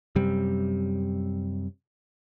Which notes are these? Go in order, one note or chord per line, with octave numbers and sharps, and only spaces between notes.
F#2 C3 G3